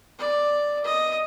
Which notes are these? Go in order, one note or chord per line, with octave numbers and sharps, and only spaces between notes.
D5
D#5